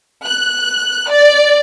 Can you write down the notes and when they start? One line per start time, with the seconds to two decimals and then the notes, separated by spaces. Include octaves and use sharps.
0.23 F#6
1.09 D5